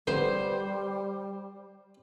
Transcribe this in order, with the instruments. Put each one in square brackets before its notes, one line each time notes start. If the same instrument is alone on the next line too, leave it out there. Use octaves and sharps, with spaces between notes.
[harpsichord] D3 E3 B3 [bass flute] G3 [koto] C5